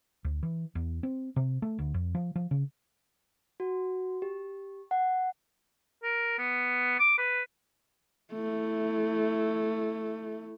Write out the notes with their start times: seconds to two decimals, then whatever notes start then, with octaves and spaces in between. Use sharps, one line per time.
0.25 D2
0.43 E3
0.75 E2
1.03 C4
1.36 C3
1.62 A3
1.79 D2
1.94 F2
2.15 F3
2.35 F3
2.51 C#3
3.60 F#4
4.22 G4
4.91 F#5
6.03 A#4
6.38 B3
6.99 D6
7.18 B4
8.33 A3 E4